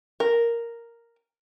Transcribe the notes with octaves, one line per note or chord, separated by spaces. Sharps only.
A#4